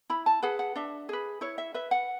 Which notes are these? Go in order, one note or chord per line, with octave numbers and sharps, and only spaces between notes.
E4 B5
A5
G#4 B4 F#5
F#5
D4 E5
G#4 B4
E4 C#5
E5
B4 E5
F#5